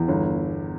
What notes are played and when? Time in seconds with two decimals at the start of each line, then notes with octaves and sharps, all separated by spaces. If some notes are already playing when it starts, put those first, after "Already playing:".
Already playing: E2
0.08 G1